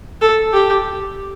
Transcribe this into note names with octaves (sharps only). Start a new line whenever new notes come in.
A4
G4